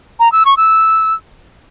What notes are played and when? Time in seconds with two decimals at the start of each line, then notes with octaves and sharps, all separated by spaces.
0.20 A#5
0.32 E6
0.46 C#6
0.57 E6